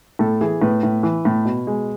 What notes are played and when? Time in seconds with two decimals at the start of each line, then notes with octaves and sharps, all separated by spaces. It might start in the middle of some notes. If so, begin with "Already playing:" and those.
0.19 A2 A4
0.41 E3 G#4
0.62 A2 B4
0.83 A2
1.03 E3
1.25 A2
1.45 B2
1.67 G#3